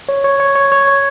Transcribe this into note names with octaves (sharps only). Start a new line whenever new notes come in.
C#5
C#5
C#5
C#5
C#5
C#5